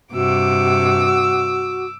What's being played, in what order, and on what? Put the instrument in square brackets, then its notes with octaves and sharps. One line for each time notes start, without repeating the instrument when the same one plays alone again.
[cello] G2 C3 [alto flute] F#4 [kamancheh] D6 E6